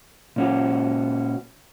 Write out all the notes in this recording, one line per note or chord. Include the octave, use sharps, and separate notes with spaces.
A#2 C#4 F#4